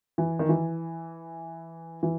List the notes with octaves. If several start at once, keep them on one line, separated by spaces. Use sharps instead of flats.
E3
D#3
E3
E3